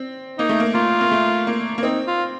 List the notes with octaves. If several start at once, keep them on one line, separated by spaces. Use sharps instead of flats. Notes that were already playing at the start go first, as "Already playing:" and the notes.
Already playing: C4
A#3 D#4
A3
A#3
A#3 F4
A#3
A3
A#3
A#3
C4 D#4
F4